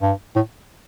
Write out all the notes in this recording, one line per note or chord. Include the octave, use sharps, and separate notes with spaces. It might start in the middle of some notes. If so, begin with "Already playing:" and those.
G2
A2